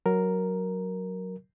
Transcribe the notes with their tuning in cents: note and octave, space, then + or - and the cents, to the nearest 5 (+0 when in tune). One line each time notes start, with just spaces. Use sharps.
F#3 +0 A#4 +0